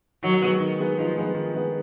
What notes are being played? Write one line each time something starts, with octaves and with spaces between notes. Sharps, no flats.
D#3 F#3
G#3 B3
D#3
G#3 B3
D#3 F3
G#3 B3
D#3
G#3 B3